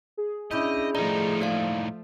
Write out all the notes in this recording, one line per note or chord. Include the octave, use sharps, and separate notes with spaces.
G#4
C#4 D4 E4 D#5 B5 G6
A2 F3 A3 D#4 D5 A#5
A#3 D5 F5